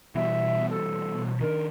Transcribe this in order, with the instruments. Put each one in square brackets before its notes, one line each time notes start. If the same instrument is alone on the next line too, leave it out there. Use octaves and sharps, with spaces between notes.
[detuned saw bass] B2 [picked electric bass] E3 G3 [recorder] E5
[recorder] A4
[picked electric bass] D#3 D4 [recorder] A#4